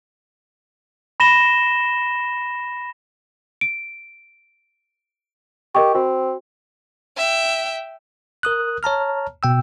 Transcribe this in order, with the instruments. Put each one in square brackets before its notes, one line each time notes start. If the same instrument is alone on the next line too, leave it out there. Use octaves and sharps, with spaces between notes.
[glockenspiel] B5 A#6 E7 G7
[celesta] D7
[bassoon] G4 [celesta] A#4 D#5 C#6
[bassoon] C4 [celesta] F#4
[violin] E5 G5
[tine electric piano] A#4 D#6 F#6
C#5 A5 A#5 F6
B2 G5 E6